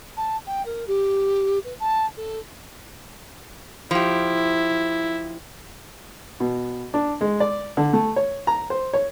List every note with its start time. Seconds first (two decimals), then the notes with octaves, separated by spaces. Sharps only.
0.16 A5
0.47 G5
0.65 A#4
0.87 G4
1.64 B4
1.79 A5
2.17 A4
3.91 F3 E4 G4
6.40 B2
6.94 D4
7.21 G#3
7.40 D5
7.77 D3
7.93 A3
8.16 C#5
8.47 A#5
8.70 C5
8.94 C#5